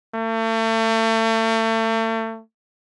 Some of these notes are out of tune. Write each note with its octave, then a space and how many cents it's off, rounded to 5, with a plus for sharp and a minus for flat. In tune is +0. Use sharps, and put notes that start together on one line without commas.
A3 +35